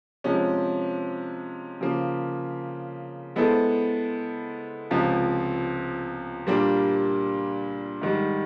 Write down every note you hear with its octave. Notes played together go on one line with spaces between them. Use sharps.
C3 F3 G#3 C#4
C#3 F3 A#3
G#3 B3 E4 A4 C5
C#2 C3 F3
A#2 G3 A#3 D4 G4
G#2 D#3 G3